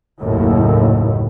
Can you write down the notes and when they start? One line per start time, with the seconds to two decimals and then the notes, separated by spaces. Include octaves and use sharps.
0.20 F#1 D#2 A2